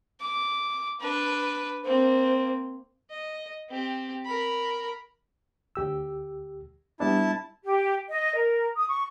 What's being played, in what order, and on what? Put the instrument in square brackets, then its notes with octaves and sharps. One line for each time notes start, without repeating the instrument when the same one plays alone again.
[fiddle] D6
D4 B4
[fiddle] A#3 C4 [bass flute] C5
[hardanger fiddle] D#5
C4 G4
A#4 B5
[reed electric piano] D2 G4 E6
[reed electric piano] G3 B3 D4 [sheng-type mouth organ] E4 A5
[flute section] G4
D#5
A#4
D#6
C#6